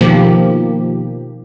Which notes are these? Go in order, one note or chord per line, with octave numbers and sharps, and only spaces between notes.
B2 D#3 F3 A#3 G4